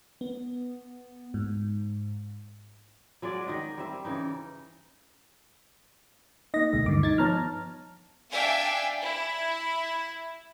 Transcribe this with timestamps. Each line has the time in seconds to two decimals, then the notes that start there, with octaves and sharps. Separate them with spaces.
0.21 B3
1.34 G#2
3.22 F#3 G#3 G#4 D5
3.46 D#3 D#5 G5
3.78 G3 C4 E5
4.05 C#3 E3 D#4
6.54 A#3 D#4 D#5 A#6
6.73 D2 B2 G#3
6.86 G2 D3 D#3 D6
7.03 D#4 G#6 A6
7.18 F3 B3 C#5 A5 A#5 F6
8.30 D4 E5 F5 G5 G#5
9.01 E4